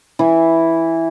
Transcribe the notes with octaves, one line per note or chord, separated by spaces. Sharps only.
E3 E4